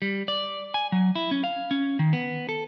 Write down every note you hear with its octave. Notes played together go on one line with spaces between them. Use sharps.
G3
D5
G#5
F#3
E4
C#4
F5
C#4
D#3
B3
A4